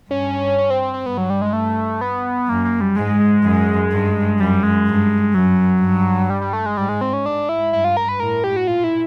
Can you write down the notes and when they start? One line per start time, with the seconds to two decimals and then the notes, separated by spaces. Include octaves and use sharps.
0.10 G2 C#4
0.58 C#4
0.70 C4
0.82 C4
0.93 C4
1.06 G2 B3
1.17 F#3
1.30 G3
1.42 G#3
1.53 A3
2.01 B3
2.48 F#2 A#3
2.65 A#3
2.81 G3
2.96 G#2 G#3
3.20 G#3
3.44 F#2
3.92 G2
4.40 F#2 G3
4.63 G#3
4.88 G2
5.34 F#2 F#3
5.82 G2
6.30 G3
6.41 G3
6.53 A3
6.66 G#3
6.77 G#2 G3
6.89 G#3
7.01 C4
7.13 C#4
7.25 G#2 D4
7.49 E4
7.73 G2 E4
7.84 F4
7.97 A#4
8.09 B4
8.20 A2 A#4
8.44 G4
8.56 F#4
8.67 A#2 F4
8.84 E4